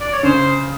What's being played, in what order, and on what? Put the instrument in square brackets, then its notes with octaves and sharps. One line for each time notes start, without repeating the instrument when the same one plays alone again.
[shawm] D5
C#5
[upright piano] C#3 [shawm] C5